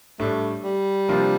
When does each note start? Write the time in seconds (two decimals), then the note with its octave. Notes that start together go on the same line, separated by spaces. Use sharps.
0.19 A2 G3 A3 D4
0.64 G3
1.08 C3 F3 A#3 D4 F4